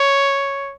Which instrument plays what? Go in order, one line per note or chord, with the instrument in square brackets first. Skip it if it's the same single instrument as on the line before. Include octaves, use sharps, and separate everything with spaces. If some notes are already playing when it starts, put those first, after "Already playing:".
Already playing: [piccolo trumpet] C#5